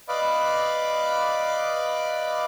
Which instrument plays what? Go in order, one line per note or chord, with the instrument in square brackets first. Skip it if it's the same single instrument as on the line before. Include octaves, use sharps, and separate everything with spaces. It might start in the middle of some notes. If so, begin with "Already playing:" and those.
[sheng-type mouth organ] B4 D5 D#5 F5 B5 D6